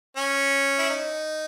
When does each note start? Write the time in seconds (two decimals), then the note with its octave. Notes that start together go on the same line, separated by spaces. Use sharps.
0.17 C#4
0.78 E4
0.90 D#4